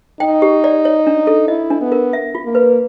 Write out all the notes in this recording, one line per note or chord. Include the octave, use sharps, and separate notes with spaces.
D#4 G5
G4
D5
C#5
D4
A4
E4 D#5
D4
B3
A#4
E5
F4
A#3
B4